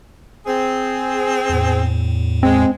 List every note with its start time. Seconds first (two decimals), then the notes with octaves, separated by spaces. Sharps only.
0.47 C4 G#4
1.50 E2 A2
2.43 G#3 C4